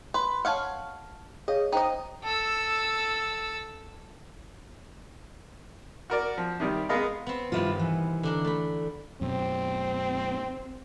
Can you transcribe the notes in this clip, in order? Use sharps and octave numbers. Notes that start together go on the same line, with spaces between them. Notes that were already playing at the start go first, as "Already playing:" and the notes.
B4 C6
C#5 F5 F#5 A5 F6
G#4 C#5 D#5 F5
D#4 C5 D#5 G5
A4 E6
F#4 A#4 D5
F3
C3 D#3 G3
G#3 B3 A#4 D#5 F5
B3 C4
G2 C3 D#3 B3 E4 F4
E3
D3 D4 A#4
A3 B5
F#2 B2 C4